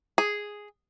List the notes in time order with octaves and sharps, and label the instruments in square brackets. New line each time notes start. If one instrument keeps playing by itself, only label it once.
[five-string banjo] G#4